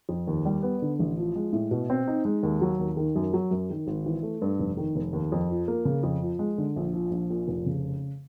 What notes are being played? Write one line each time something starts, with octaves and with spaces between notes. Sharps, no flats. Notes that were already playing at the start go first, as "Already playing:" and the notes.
F2
D#2
G3
B3
D3
A1
F3
G#3
A2
B2
C4
D#4
G#3
D#2
F#3
D#2
D#3
F#2
F#3
F#2
D#3
G#1
E3
A3
G2
F1
D#3
F1
D#2
F2
F3
A#3
C#3
F2
F3
G#3
D3
A#1
F3
A#1
A#2
F1
C#3